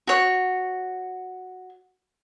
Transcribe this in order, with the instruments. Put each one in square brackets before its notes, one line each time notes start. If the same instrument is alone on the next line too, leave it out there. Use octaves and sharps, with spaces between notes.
[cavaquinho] F#4 C#5